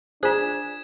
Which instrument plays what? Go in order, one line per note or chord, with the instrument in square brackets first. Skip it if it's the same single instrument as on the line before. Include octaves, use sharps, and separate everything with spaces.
[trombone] D4 [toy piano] F4 C5 [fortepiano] G#4 [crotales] G#6 E7